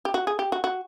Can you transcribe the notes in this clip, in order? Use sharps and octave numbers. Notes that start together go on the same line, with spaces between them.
G4
F#4
G#4
G4
F#4
F#4